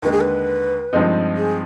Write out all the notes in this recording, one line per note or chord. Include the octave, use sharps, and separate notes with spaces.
D#2 D3 G#3 B4
G#4
B4
G2 F3 G#3 C4 D#4
G#4